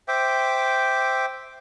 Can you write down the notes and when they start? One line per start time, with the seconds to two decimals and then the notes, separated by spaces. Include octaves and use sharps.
0.08 C5 E5 G5 D6